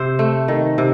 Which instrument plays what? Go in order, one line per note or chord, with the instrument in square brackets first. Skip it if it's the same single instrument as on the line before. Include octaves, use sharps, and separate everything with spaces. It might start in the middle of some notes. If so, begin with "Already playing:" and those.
Already playing: [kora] C3 C5
A3
D#3
C3